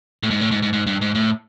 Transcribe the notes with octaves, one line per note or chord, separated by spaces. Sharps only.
A2
G#2
A2
G#2
G#2
G#2
G2
G#2
A2